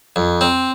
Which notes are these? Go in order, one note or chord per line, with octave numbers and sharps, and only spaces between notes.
F2
C4